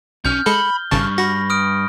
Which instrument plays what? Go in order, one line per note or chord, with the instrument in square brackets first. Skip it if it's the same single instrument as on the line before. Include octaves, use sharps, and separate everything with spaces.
[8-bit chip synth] B1 [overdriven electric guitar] C#4 [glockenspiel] F6 G6
[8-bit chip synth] G#3 A4 C#7 [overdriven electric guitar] B5 [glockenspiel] G7
[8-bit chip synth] G#1 C#3 A5 [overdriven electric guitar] G2 [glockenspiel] C#6
[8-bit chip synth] F#4 [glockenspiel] B5 A#6
[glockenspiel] D#6 F6 D7